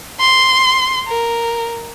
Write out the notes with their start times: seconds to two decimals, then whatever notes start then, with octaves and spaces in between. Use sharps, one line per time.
0.20 C6
1.07 A#4